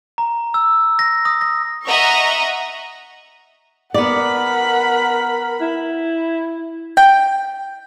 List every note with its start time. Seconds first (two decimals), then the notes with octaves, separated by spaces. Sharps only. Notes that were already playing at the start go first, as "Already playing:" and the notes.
0.18 A#5
0.54 E6
0.99 A#6
1.25 D#6
1.41 A#6
1.86 D#5 E5 F#5 A#5 C#6
3.94 B3 A#4 D5 F#5 B5
5.61 E4
6.97 G5